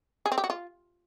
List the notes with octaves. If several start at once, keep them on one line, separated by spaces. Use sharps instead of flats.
G#4
C4
G4
F#4
F4